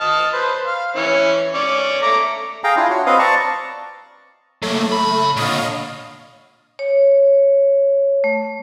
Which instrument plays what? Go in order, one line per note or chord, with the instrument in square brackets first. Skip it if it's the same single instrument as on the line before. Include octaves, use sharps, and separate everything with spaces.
[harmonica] D#5 A5 F6
B4 C5
F5
E3 C#4 C#5
C#4 D5
A3 A#5 D6
[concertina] G#4 F5 G5 A#5
D4 E4 F4
F#4 C#5
C4 B4 D#5 F5
D5 A5 A#5 C#6
[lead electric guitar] F#3 A#3 [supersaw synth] A3
[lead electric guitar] C#3 B5
[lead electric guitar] A#2 D3 [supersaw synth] C#5 D#5 F5
[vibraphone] C#5
A3